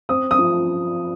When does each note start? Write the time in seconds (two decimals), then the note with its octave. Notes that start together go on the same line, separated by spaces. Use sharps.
0.09 C4 D#6
0.31 D#6
0.39 F3